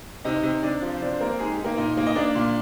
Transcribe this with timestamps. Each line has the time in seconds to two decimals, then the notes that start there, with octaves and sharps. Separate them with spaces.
0.24 C3 D#4 D#5
0.43 C3
0.63 C3 D4 D5
0.82 F3
0.95 C5
1.01 C3 D4 D5
1.13 C5
1.20 A#3 C4 A#4
1.39 G#3 D#4 G#4
1.52 G4
1.59 D#4
1.64 A#3 A#4
1.78 A#2 D#4 D#5
1.97 A#3
2.06 D#5
2.15 A#3 D4 D5
2.35 A#2